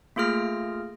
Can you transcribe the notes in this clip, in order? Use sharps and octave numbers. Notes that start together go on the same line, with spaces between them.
A3 A#3 F4 G#4 F6 A#6